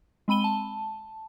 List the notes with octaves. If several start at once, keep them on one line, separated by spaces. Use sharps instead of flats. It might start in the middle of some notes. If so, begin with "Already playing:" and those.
G#3 C4 B5 D#7 G7
A5